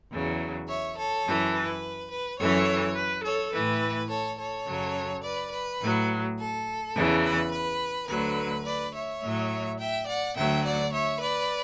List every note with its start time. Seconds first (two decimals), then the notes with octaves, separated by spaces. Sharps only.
0.11 E2 C#3 F#3
0.68 C#5 E5
0.97 A4 C#5
1.25 F#2 E3
1.54 B4
2.10 B4
2.38 F#2 E3 A4 C#5
2.96 B4
3.24 A4 C#5
3.52 A2 E3 B4
4.09 A4 C#5
4.38 A4 C#5
4.67 F#2 C#3 F#3
5.23 B4 D5
5.51 B4
5.80 A2 F#3
6.38 A4
6.94 E2 C#3 E3
7.23 B4
7.51 B4
8.08 D2 D3 F#3 B4
8.64 B4 D5
8.94 C#5 E5
9.21 A2 F#3
9.79 E5 G5
10.07 D5 F#5
10.36 D2 D3 F#3 E5 G5
10.64 D5 F#5
10.93 C#5 E5
11.21 B4 D5